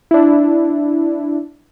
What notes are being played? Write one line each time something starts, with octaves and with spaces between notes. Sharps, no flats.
D4 E4